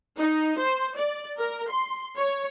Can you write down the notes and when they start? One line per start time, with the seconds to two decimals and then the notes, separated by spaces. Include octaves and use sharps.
0.19 D#4
0.59 C5
0.97 D5
1.39 A#4
1.70 C6
2.17 C#5